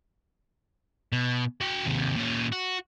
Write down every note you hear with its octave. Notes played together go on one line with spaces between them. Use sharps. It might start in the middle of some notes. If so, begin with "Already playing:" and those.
B2
F#4 G5
D#2 C3
A#2 C#4
F#4